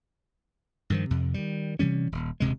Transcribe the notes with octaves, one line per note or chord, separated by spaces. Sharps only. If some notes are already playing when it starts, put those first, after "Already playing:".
G2 D#3 F3
F2 C3
D#3 G3
C3 E3 G3 C#4
D#1
D#1 D2 C3 G#3